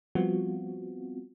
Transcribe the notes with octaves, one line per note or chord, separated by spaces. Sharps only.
F3 G3 B3 C4 F4 F#4